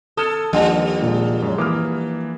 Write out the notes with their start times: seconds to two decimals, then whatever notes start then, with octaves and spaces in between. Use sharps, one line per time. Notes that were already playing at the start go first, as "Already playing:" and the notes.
0.17 A4 D#6 F6 G#6
0.53 D#2 F3 G3 D4 F#5
1.02 A#2 G#3
1.42 F#2 G#3 C#5
1.58 E3 A#3 D6 D#6 F6